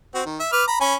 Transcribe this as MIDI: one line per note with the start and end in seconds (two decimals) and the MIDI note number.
0.14 0.22 60
0.14 0.22 66
0.26 0.39 51
0.40 0.48 76
0.52 0.64 71
0.52 0.64 86
0.52 0.64 89
0.68 0.80 82
0.68 0.80 83
0.81 0.95 61
0.81 0.95 80
0.81 0.95 83